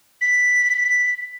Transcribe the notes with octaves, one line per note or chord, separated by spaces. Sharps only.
B6